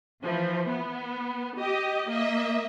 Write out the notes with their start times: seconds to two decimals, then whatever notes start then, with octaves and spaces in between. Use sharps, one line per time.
0.23 E3 F3
0.68 B3
1.57 G4 D#5
2.10 A#3 D#5 E5